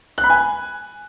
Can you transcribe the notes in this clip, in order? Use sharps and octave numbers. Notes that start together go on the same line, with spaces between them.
F#6
B5
G#5